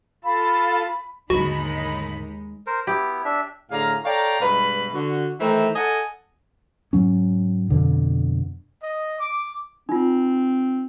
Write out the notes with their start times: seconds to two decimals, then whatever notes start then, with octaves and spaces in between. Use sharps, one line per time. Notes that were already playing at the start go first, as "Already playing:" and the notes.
0.24 F4 A4 F5 A5 B5
1.30 D#2 G#2 D3 G#3 D#4 F#4 B5
2.67 A#4 C5
2.87 B3 E4 G4
3.25 D4 E5
3.71 A2 D3 D4 G#4 F5 A#5
4.05 A4 C#5 D5 F5 G5 A#5
4.40 G2 B2 G#3 B4 B5
4.94 D3 F#4
5.40 D#3 E3 A3 C5 G5 A#5
5.76 A4 D#5 F#5 G#5 A5
6.93 G#2 F#3 C#4
7.70 F2 B2 D3
8.82 D#5
9.19 D6
9.89 C4 D#4 F4